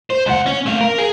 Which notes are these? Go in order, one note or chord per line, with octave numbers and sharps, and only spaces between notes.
C5
C#2 F#5
C#4
A3 F5
A#4
G#4